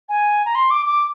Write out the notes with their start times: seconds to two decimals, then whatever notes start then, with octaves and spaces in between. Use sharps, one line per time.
0.09 G#5
0.45 A#5
0.55 C6
0.70 D6
0.86 D6